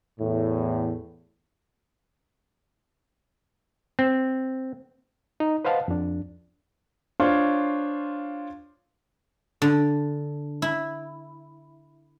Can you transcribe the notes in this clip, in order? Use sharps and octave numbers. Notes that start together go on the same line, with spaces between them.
E2 A2
C4
D#4
B4 C5 D#5 F5 F#5 A5
F2 D4
D4 F4 C5 C#5 F5 C6
D3
E4